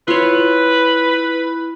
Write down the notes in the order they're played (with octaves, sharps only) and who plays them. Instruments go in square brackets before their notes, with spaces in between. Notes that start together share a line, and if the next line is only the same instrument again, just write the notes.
[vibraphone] E4 B5 [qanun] F4 C#5 [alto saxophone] B4